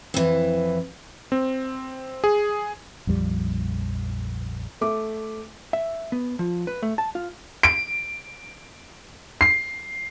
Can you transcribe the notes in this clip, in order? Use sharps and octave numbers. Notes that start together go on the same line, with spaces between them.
F2 E3
C4
G#4
A#1 F2 G3
A3 D6
E5
B3
F3
B4
A3
A5
F4
D7
C7